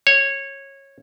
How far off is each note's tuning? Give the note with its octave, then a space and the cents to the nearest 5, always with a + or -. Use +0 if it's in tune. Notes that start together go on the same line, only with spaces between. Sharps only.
C#5 -15